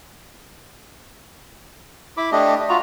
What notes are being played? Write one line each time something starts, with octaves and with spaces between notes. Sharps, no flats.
E4 B5 D6
A3 D4 G4 D#5
F4 F#4 A#5